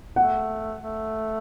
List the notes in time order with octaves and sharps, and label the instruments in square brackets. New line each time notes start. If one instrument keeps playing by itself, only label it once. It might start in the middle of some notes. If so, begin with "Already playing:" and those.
[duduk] A3 [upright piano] F#5
[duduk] A3